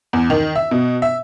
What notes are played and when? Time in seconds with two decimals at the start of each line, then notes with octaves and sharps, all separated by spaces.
0.13 E2
0.30 D#3
0.56 E5
0.71 B2
1.02 E5